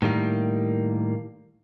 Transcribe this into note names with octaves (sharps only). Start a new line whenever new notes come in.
A2 D#3 G3 A#3